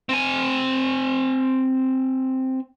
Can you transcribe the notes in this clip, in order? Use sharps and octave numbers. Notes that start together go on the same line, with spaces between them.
C4 G#5